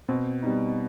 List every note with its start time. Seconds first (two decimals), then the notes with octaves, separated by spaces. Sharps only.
0.08 B2 C4
0.42 G3 B3 D#4